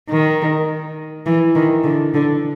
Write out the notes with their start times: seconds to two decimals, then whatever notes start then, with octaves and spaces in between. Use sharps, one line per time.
0.09 D#3
1.26 E3
1.55 D#3
1.84 D3
2.14 D3